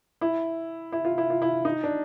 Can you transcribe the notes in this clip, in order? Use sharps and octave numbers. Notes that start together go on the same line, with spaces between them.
E4
E4
F4
E4
F4
E4
D#4
D4